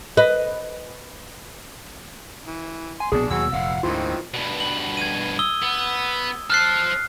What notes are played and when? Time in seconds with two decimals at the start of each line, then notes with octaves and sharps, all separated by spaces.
0.17 B4 D#5
2.47 E3
3.00 G#5 C6
3.12 A#1 B2 B3 D4 G#4
3.31 D#2 B2 F#3 F#4 G#4 E6
3.53 F1 A#2 F5 F#5
3.83 D2 G#2 D#3 E3 C4 F4
4.34 G2 B2
4.60 F#7
4.97 G#6 D#7
5.39 D#6 E6 G7
5.63 B3
6.50 C5 A5 F6 F#6 C7